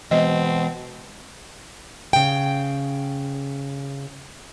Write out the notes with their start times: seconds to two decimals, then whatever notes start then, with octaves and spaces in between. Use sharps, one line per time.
0.11 B2 E3 G#3 C4 D#5
2.13 C#3 G5